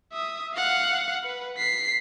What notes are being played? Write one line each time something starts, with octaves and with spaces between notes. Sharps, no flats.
E5 D#6
F5 F#5
B4
B6 C7